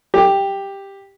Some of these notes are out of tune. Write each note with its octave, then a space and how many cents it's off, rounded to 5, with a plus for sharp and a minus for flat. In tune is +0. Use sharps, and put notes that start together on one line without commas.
G4 +5